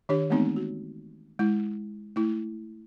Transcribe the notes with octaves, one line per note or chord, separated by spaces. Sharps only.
D#3 D4 G4 C#5
E3 G#3 A3 B3 C4 D#4
F#4
G#3 E4
A3 E4